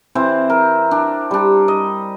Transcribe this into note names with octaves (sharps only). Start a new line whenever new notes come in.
E3 C4 C5
A#4
D4
G3 D4
D#5